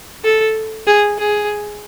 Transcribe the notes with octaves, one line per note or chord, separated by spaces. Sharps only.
A4
G#4
G#4